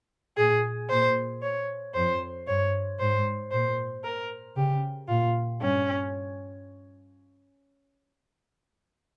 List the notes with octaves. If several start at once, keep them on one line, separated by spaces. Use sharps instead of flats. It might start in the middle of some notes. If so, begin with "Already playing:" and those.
A#2 G#4
A#2 C5
C#5
F2 C5
G2 C#5
G#2 C5
A#2 C5
A#4
C#3 G4
A#2 F4
G2 C#4